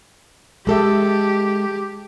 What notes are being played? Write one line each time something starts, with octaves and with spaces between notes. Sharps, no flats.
G#3 G4 A4 E5